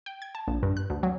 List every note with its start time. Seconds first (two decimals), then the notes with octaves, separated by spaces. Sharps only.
0.06 G5
0.22 G#6
0.35 A5
0.47 A#1
0.63 G2
0.77 F#6
0.90 D2
1.03 F#3